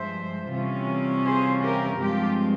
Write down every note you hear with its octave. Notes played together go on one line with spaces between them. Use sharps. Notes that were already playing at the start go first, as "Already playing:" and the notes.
Already playing: G2 F3 G#3 C5 E5
C3 E3 G3 C#4 F4
G#4 C5
G4 A#4
G2 F3 G#3 C4 F4 G4